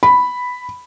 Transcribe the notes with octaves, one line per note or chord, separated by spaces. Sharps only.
B5